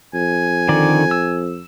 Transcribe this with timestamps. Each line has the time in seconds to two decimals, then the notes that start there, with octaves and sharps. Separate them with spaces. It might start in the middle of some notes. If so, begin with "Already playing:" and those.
0.14 F2 G#5
0.69 D3 D#3 D5
1.11 E6